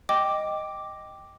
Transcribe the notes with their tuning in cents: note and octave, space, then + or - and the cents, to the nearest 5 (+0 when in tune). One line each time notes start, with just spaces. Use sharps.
D#5 +0 G5 +0 D6 +0